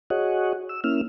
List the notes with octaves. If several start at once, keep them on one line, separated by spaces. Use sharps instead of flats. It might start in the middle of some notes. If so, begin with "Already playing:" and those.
F#4 G#4 C#5 D#5 F#5
E6
A#3 C#4 E4 E6 F6